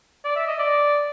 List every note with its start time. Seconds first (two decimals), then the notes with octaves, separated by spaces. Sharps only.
0.25 D5
0.36 E5
0.47 D#5
0.59 D5